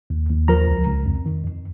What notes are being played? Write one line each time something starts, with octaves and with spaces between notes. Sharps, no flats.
D#2
D#2
F3 A#4 A#5
C#2
C#2
F2
D#3
F2